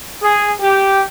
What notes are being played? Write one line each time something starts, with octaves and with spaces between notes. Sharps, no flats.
G#4
G4